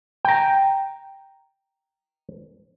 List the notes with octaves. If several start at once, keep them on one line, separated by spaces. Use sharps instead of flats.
G5 A#5